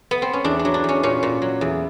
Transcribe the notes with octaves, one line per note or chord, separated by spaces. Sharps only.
B3
C4
C#4
E2 D4
D4
F#3
D4
E2 C#4
A#2 C#4
A#2
F#3
E2